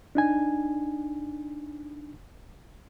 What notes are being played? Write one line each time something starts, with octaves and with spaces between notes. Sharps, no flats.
D4 D#4 G#5